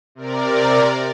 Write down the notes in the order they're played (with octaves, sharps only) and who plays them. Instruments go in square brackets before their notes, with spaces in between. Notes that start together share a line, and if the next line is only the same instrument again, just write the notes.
[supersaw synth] C3 A#4 D5